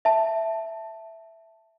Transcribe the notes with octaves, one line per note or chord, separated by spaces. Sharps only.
E5 A5